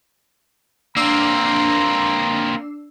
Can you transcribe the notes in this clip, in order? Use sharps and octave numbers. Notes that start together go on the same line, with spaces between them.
A#3 C4 D4 A#5 C6 E6 C7